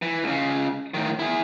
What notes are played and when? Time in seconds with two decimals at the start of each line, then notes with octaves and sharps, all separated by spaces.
0.02 E3
0.24 C#2 C#3
0.94 A2 D#3
1.19 E4 G#4